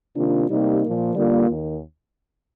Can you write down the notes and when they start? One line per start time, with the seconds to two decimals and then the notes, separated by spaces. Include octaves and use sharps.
0.15 C3 D#3 A#3 D4 F4
0.48 C3 G3 A#3 D#4 G4
0.82 A#2 F3 A#3
1.14 D3 G3 A#3 F4
1.48 D#2 D#3